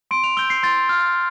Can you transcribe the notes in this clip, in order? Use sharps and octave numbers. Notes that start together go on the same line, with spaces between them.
C6 D7
F7
E6 G6 G7
C7
C6 A6
F6